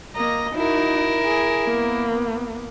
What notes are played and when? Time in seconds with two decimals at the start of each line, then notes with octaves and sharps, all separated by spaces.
0.16 A#3 D#5 A#5
0.55 D#4 E4 F#4 A#4
1.23 G#4
1.66 A#3 B3